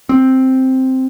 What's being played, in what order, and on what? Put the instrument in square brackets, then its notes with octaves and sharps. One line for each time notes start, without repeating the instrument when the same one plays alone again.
[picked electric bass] C4